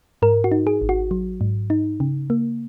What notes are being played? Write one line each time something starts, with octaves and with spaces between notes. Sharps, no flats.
G#2 A#4
F#4
D#4
G#4
G#1
F#4
F#3
G#2
D#4
C#3
A#3